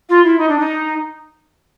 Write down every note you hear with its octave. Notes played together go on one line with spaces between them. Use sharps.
F4
E4
D#4
D4
D#4